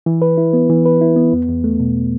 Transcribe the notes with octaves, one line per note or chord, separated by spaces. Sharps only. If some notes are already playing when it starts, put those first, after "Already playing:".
E3
B4
E4
B3
E3
B4
E4
B3
E2
E2
A3
B2